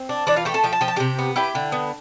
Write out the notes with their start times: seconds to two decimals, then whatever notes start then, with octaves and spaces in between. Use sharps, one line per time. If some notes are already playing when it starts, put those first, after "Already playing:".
Already playing: C4
0.09 D4
0.27 E3 D4 D5
0.36 F4 F5
0.45 A3 G4 G5
0.54 A4 A5
0.64 F3 G5
0.73 A5
0.81 F3 G5
0.88 A5
0.96 C3 G4 G5
1.19 B3
1.36 E4 G4 G5
1.55 D3
1.72 B3